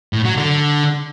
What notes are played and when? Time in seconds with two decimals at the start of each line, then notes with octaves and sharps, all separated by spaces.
0.13 A2
0.25 F#3
0.37 D3